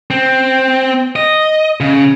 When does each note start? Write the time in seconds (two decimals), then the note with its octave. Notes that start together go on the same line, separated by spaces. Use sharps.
0.11 C4
1.16 D#5
1.80 C#3